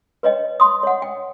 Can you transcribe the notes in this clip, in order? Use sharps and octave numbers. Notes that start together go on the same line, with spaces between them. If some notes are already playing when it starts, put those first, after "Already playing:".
B4 C#5 D#5 G5
C6 D#6
C#5 F#5
G5